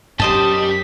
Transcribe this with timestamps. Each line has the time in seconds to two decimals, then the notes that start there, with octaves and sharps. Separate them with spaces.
0.20 F#2 G3 C#4 G4 C5 D#5 A5